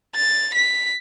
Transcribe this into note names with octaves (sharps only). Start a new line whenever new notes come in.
A6
B6